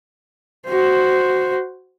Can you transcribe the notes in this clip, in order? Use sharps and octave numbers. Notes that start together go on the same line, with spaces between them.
F#4 C5